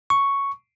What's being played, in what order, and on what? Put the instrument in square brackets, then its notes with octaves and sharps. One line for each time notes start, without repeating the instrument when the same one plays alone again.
[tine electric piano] C#6